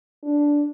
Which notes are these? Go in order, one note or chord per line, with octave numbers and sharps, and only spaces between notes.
D4